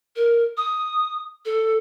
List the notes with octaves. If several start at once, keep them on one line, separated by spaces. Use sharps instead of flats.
A#4
D#6
A4